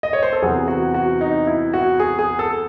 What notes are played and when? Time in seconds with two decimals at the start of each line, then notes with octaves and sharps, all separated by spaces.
0.03 D#5
0.13 C#5
0.23 C5
0.33 A4
0.42 E2 C3 F#3 C4 G#4
0.68 F#4
0.94 F#4
1.21 D#4
1.47 E4
1.73 F#4
2.00 G#4
2.19 G#4
2.39 A4